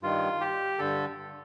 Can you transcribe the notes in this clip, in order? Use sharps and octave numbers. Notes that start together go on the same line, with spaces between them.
G2 D#3 F4
G4
G2 D3 A4